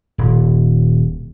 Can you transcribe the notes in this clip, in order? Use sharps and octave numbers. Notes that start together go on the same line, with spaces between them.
D#1